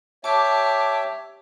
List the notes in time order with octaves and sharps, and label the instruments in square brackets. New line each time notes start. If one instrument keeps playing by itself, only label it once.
[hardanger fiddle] G4 [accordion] C#5 E5 [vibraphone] A5 D6